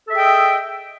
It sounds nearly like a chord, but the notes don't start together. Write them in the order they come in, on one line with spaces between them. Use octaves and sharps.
A4 E5 G#4 G5 D#5